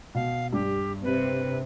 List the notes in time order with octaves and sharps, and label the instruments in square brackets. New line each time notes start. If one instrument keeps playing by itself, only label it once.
[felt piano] B2 [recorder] F5
[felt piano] G2 [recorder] G4
[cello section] C3 [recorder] B4